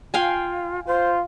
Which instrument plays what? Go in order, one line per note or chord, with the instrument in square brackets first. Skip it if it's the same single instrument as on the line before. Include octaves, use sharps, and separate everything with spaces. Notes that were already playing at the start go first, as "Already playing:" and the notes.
[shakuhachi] F4 [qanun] F5 G5 G#5
[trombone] F4 [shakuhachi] C5